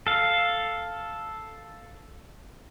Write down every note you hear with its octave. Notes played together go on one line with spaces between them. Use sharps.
A4 F5